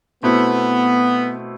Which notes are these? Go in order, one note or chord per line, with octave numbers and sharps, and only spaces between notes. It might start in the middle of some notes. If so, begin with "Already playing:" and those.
B2 A3 B3 C4 E4